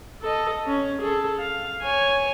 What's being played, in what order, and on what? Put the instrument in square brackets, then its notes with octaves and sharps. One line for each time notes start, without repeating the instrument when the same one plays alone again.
[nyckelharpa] A4 D#5
C#4
G#4 A4
F5
C#5 G#5